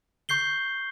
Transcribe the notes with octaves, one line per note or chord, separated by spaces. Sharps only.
C#6 G6 C7 G7